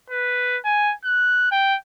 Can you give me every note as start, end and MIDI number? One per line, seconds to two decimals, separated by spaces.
0.10 0.58 71
0.65 0.94 80
1.05 1.48 90
1.51 1.77 79